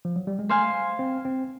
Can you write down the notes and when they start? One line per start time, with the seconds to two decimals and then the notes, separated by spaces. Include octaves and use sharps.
0.05 F3
0.16 F#3
0.27 G3
0.39 G#3
0.49 A3 C5 F5 G#5
0.99 C4
1.25 C4